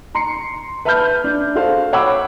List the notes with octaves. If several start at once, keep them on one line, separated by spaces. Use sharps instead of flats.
A#5 C6 C7 C#7
B4 E5 A5 B5 F6 G6
D4
F#4 A4 C5 F5
C#5 F#5 B5 D6 E6